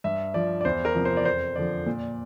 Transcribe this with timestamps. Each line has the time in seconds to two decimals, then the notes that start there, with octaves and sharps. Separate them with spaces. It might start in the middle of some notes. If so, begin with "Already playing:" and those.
0.04 G2 E5
0.34 F3 D5
0.61 D5
0.65 E2 C5
0.85 A#4
0.95 C3 F3
1.05 C5
1.17 D5
1.25 F2 C5
1.56 D3 F3 D5
1.86 A#2